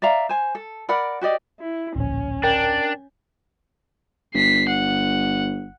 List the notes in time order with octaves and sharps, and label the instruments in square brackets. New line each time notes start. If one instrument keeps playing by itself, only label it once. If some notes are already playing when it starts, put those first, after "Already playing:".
[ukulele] D5 E5 F5 A#5
C5 G#5
A4
A#4 D5 F#5 B5
F#4 G4 D5 D#5
[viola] E4
[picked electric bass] D1 A#1 [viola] C#4
[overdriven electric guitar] D4 [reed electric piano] A#4 G5
[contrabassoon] G1 [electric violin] B6 C7
[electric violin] F#5